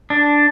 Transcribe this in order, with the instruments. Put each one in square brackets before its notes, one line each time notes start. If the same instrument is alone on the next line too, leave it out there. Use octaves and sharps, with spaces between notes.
[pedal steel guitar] D4